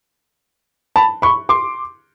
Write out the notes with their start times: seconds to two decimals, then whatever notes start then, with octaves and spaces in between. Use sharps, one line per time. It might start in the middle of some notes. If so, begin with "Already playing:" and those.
0.96 A5 B5
1.22 B5 C#6
1.49 C6 D6